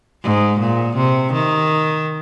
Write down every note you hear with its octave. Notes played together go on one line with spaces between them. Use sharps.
G#2
A#2
C3
D#3